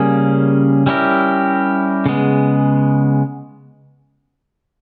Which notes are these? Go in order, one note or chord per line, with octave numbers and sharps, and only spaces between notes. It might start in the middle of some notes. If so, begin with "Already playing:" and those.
Already playing: C#3 G3 A#3 C#4 G#4
G3 C#4 E4 G4 A#4
C#3 G#3 B3